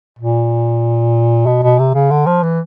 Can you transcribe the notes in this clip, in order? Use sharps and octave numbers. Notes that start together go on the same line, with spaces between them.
A#2
B2
B2
C3
C#3
D3
F3
E3